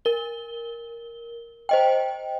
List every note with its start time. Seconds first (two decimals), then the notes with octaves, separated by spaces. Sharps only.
0.05 A#4 G7
1.69 C5 D#5 G5